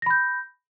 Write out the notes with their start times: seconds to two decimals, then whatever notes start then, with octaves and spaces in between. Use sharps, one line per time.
0.02 A#6
0.06 B5
0.10 G6